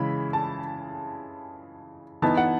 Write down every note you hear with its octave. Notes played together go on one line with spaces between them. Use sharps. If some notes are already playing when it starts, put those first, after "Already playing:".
Already playing: C#3 E3 G#3 B5
A5
E3 B3 D#4 A5
F#5